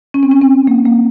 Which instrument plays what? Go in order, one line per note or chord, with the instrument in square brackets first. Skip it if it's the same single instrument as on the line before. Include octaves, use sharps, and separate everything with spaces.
[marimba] C#4
C4
C#4
C4
A#3
A#3